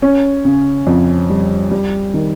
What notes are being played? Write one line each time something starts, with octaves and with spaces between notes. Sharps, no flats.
C#4
C#3
F2
G3
G3
D#3